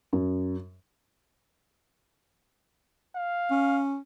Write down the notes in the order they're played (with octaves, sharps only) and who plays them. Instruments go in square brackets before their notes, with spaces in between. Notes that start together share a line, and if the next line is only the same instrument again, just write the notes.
[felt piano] F#2
[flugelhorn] F5
[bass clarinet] C#4